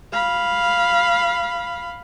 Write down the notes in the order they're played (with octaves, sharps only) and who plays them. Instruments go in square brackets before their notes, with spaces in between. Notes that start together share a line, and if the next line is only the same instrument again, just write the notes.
[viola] F5 B5